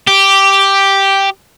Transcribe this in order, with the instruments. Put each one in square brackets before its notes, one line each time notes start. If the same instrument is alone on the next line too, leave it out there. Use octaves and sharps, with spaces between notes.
[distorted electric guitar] G4